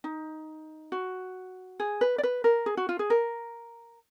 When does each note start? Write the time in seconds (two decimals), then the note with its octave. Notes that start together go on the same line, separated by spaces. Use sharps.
0.04 D#4
0.92 F#4
1.80 G#4
2.01 B4
2.18 D5
2.23 B4
2.44 A#4
2.66 G#4
2.77 F#4
2.89 F4
2.99 G#4
3.10 A#4